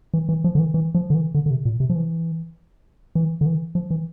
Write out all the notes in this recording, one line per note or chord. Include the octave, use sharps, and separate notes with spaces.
E3
E3
F3
D3
E3
E3
F3
D3
E3
D3
D3
C3
A#2
C3
F3
E3
E3
D3
E3
F3
E3